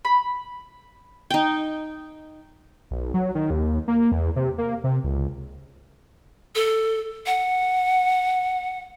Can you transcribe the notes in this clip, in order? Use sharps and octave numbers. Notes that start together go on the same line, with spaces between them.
B5
D#4 G5
B1
F#3
D#3
D#2
A#3
E2
C3
A#3
C3
C#2
A4
F#5